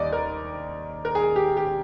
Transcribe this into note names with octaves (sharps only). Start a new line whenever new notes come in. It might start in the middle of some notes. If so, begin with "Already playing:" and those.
Already playing: D#2 D#3 G3 D5 D#5
A#4
A#4
G#4
G4
G4